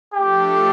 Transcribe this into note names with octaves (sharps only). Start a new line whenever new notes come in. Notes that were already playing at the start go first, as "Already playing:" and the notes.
F3 A3 D4 G4 A4